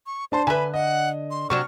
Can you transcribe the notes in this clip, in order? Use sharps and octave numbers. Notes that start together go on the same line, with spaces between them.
C#6
D4 C5 A5 C6
D3 B4 E5 G#5 B5
D#5 F#5
C6
C3 F#3 D4 C#6 F6